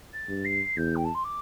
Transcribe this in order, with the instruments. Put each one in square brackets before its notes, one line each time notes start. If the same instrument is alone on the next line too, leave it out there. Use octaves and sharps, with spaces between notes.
[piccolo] A6
[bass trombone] G2
[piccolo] C7
[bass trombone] E2 [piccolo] G6
[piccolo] G5
A5
C6
D6